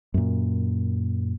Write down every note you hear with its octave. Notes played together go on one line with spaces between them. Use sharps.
F#2 A#2